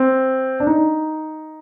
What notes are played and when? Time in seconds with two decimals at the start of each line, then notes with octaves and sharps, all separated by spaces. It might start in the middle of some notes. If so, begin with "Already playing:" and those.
Already playing: C4
0.60 D4
0.67 D#4